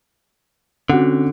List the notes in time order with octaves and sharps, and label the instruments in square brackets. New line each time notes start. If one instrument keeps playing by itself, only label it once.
[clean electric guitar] D3 [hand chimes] C4 C#4 [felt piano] F#4 F#5